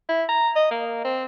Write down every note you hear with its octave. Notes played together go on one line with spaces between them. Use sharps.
E4
A#5
D#5
A#3
C4